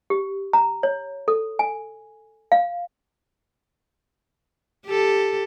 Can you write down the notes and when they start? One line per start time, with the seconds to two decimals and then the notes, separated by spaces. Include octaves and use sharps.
0.10 G4
0.53 A#5
0.83 C#5
1.28 A4
1.59 G#5
2.52 F5
4.85 G4 A4